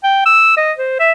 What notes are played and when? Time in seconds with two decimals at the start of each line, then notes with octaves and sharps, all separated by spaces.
0.03 G5
0.26 E6
0.57 D#5
0.78 C5
1.00 E5